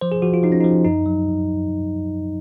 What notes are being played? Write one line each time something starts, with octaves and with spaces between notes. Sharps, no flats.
F3 C5
G#4
F3 F#4
F4
F3 D#4
C#4
F3 D#4
F#2 D#4
F#3